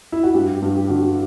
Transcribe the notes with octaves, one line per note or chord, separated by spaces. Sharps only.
E4
F#4
G2 G4
G2
G4
D3 F#4
G4